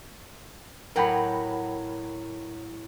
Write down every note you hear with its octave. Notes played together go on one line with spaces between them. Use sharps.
A2 F#3 A#4 F#5 G5 B5